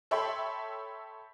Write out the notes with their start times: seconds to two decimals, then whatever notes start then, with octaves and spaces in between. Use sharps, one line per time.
0.11 A4 C#5 E5 G5 B5 C6